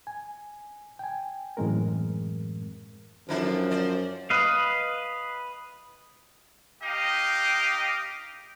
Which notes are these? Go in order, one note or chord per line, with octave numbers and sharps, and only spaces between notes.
G#5
G5 G#5
F#2 A2 E3 G#3 C4 A#4
F#2 D#3 F3 D4 A4
C5 D5
B4 D#5 F5
D#4 G4 D#5 F5 G5